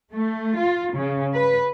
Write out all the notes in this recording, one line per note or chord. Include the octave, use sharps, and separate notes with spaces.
A3
F4
C#3
B4